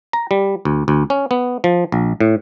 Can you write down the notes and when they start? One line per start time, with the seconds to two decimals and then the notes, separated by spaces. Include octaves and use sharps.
0.13 A#5
0.31 G3
0.65 D2
0.88 D2
1.10 C#4
1.31 B3
1.64 F3
1.92 A#1
2.20 A2